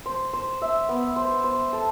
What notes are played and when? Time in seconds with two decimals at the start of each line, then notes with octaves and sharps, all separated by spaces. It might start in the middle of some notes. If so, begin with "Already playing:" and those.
0.06 C5
0.33 C5
0.62 E5
0.89 B3
1.16 C5
1.44 C5
1.73 A4